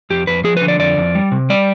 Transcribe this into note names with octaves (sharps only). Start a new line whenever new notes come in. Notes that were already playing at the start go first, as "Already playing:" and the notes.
F2 G4
F2 B4
F3 G#4
B4
D3
D5
F2 D5
F2
G3
C3
G3 D5